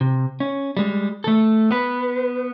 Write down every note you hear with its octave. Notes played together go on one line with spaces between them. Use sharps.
C3
C#4
G3 G#3
A3 A4
B3 B4